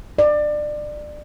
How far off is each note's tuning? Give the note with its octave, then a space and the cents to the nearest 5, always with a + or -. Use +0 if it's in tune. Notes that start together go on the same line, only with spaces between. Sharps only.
D5 +25